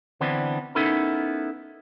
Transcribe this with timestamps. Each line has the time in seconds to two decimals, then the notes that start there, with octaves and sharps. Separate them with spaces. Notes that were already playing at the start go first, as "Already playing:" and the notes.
0.21 D3 E3 B3 C4 D4
0.75 B3 C#4 D#4 E4 A4 A#4